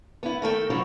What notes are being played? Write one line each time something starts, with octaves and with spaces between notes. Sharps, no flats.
B3 E4
D#3 A3 A4 G5
C3 F#3 G3 E4 F4 C#5